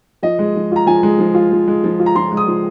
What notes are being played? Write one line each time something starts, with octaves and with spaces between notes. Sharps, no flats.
F3 D#5
G#3
F3
F4 A#5
F3 G#5
G#3
F3
F4
F3
G#3
F3
F4
A#5
F3 C6
G#3
D#6
F3